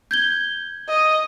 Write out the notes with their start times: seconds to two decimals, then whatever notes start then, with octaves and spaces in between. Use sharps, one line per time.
0.11 G6 G#6 G7
0.89 D#5